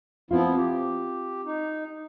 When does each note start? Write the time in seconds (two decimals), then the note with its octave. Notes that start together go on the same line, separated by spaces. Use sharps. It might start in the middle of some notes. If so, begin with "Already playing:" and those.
0.31 F3 B3 C4 E4 F4
0.57 G4
1.45 D#4